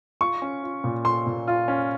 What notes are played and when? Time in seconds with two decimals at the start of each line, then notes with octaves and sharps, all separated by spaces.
0.21 F4 C#6
0.42 C#4
0.63 F4
0.84 A#2
1.05 F4 C6
1.27 A#2
1.48 F4
1.68 C#4